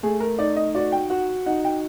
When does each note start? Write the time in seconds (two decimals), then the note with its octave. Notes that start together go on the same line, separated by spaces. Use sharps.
0.03 A3 G#4
0.20 A#4
0.39 D#4 D5
0.56 D#5
0.75 F#4 D5
0.92 G5
1.10 F#4 F#5
1.46 D#4 F#5
1.65 G5